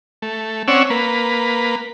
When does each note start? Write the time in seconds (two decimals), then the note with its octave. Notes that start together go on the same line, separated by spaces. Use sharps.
0.22 A3
0.68 C4 C#4 C#5 D5 F#5 E6
0.90 A#3 B4